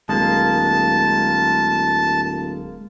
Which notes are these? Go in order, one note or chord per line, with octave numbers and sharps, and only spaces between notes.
D1 G#3 A#3 A5